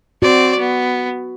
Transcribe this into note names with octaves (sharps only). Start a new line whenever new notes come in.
C4 F#4 D5
B3